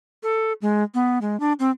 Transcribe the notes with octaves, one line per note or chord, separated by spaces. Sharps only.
A4
G#3
B3
G#3
D4
C4